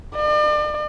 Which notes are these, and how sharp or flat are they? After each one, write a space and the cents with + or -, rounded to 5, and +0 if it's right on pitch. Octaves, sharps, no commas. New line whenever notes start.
D5 +40